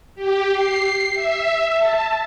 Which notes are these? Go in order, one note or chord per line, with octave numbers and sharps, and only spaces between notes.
G4
C7
E5
A5